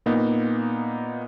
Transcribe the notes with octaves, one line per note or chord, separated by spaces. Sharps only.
A#2 A#3 B3 D#4